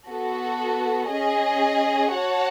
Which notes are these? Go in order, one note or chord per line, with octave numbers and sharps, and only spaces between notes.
B3 F#4 A4
C#4 G#4 D#5
F#4 C#5 F#5 A5